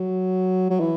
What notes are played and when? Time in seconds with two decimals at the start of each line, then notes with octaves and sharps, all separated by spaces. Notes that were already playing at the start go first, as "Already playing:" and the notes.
Already playing: F#3
0.70 F#3
0.80 E3